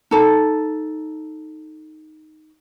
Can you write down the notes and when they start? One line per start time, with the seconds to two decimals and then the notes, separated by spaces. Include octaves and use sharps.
0.11 D#4 A4